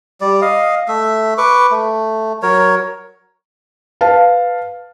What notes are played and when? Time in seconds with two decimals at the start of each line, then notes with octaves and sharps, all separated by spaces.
0.21 G3 D5
0.41 D#5 F5
0.88 A3 E5
1.38 B4 C#6 D6
1.71 A3
2.43 F#3 A#4 C#5
4.01 B4 F5 A5